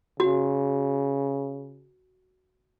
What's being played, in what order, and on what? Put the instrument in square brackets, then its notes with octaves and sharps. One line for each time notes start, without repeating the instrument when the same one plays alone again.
[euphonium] C#3 [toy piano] F#4